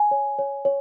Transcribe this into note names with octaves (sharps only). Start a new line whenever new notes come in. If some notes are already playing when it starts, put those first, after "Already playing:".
Already playing: G#5
C#5
C#5
C#5